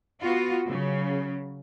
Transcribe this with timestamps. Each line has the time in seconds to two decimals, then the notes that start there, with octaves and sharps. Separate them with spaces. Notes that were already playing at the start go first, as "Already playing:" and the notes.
0.21 B3 F4 F#4
0.68 C#3 F#3